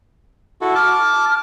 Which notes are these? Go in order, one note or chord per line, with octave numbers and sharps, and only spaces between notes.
E4 F#4 A4
A5 D6 F6